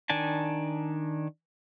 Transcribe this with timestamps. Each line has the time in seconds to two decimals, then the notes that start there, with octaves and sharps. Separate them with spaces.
0.10 D#3 D4 G#5 A5